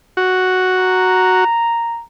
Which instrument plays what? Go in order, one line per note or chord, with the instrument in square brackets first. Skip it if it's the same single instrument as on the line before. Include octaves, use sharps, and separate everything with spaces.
[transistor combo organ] F#4
[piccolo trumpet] A#5